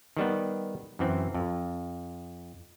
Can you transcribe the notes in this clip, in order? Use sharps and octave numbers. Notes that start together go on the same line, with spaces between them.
D#3 G3 B3
F#2 E3 C4
F2